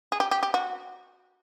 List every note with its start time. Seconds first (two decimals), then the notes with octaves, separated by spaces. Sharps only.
0.12 G#4
0.20 G4
0.31 G4
0.43 G4
0.54 F#4